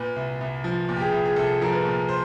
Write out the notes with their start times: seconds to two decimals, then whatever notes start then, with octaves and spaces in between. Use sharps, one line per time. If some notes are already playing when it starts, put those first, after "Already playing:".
Already playing: A#2 B4
0.16 C2
0.41 C2
0.64 F3
0.89 A#2
0.96 G4
1.01 G#4
1.12 C2
1.26 G#4
1.36 C2 A4
1.62 F3 A#4
1.73 B4
1.85 A#2
2.09 C5